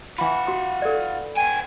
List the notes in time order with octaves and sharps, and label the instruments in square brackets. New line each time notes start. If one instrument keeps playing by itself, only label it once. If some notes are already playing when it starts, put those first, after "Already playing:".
[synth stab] E3 B5 [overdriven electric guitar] F4 F#5
[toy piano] F#4 C6
A4 D5
[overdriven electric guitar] B3 G5 [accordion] G#5